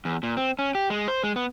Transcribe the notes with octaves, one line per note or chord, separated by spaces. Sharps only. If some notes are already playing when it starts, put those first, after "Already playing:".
E2
A#2
C4
C#4
G4
G#3
C5
G#3
B3